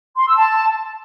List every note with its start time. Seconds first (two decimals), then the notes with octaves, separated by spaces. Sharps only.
0.17 C6
0.27 E6
0.37 A5